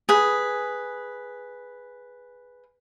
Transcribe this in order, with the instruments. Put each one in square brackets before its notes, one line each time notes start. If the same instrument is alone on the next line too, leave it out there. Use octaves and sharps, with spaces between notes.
[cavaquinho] G#4 B4